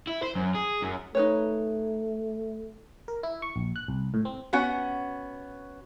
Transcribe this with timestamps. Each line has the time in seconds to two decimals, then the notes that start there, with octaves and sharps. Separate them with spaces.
0.07 E4
0.23 C5
0.35 F#2
0.55 G#4
0.83 F#2
1.15 A3 D#4 B4 C#5
3.08 A#4
3.23 E4
3.42 C#6
3.56 A#1
3.76 F#6
3.88 C2
4.14 A2
4.25 C4
4.53 B3 C#4 F#4 F#5